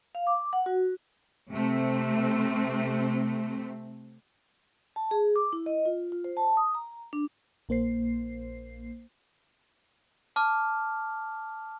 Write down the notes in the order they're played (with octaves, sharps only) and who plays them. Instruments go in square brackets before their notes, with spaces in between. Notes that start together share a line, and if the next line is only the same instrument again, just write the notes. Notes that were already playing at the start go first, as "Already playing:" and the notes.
[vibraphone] F5
D6
F#5
F#4
[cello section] C3 A3 C4
[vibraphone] A5
G#4
D6
E4
D#5
F4
F4
C5
A5
D#6
A#5
D4
[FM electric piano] A#1 A#3 C5 C7
[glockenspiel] A5 D6 F6